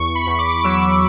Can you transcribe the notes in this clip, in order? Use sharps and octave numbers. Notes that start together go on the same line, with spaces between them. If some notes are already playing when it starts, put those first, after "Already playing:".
Already playing: E2 C#6
B5
E2
D6
F#3 E6